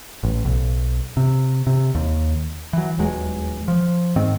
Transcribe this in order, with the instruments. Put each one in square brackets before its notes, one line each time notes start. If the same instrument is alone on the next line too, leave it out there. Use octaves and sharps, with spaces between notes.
[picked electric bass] A1
B1
C3
C3
D#2
E3 F#3
D#1 E2 F#3 G#3
F3
G#2 D#3 C4